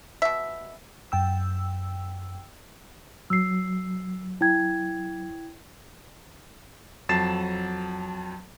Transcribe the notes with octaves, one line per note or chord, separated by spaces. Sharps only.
B2 E5
F#2 G5 E6
F#3 E6 C7
E4 G5 G#6
F2 F#3 A5 A6 C7 E7